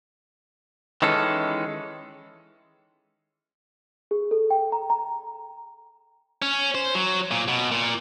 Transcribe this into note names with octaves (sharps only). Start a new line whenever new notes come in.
D#3 E3 G#3 C#4 A4
G#4
A4
G5
A#5
A#5
C#4
C5
F#3
A#2
B2
A#2